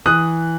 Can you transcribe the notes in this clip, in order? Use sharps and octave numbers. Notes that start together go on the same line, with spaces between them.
E3 D#6 F#6